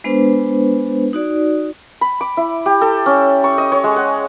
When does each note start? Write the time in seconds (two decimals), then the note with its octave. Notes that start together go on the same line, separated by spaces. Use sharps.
0.04 G#3 B3 D4 B4 C5
1.13 D#4 F#4 D5
2.01 B5
2.21 D6
2.37 E4
2.66 G4
2.81 A4
3.06 C#4
3.44 C#6
3.58 D#5
3.72 C#5
3.84 G#3
3.96 F#5